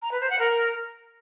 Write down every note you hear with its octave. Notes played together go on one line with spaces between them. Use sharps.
A#5
B4
C5
F#5
A#4